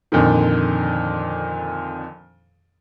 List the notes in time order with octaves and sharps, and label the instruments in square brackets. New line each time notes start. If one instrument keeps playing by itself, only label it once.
[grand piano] F2 A#2 D3 D#3